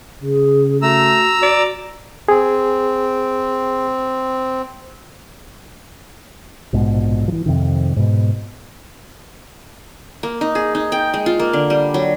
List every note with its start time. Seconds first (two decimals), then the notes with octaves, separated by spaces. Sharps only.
0.22 C#3 G#4
0.82 A3 F#4 A#5 E6
1.42 D5
2.29 C4 G#4
6.73 A#1 G#2 B2
7.28 E3 F3
7.46 F2 C3 D#3
7.96 G#2 B2
10.23 A#3
10.41 D#4
10.55 G#4
10.75 D#4
10.92 G5
11.14 G#3
11.26 F4
11.39 A#3
11.53 D3
11.70 G3
11.94 F#3